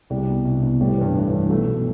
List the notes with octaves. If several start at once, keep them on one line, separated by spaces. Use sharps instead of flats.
C2 G3
B2
C2
B2
A1 G3
G2 E3
A1
G2 E3
B1 F#3 A3
B2